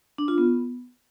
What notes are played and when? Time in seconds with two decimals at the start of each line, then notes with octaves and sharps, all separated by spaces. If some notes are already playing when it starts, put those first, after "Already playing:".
0.18 D4
0.28 F4
0.38 B3